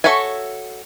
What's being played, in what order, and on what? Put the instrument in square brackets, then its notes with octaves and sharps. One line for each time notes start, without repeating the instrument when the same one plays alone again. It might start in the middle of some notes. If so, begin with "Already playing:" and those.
[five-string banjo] F#4 A4 C#5 E5 G#5